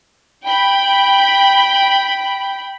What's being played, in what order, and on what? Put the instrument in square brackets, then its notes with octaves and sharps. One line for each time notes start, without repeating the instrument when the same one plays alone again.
[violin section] G5 B5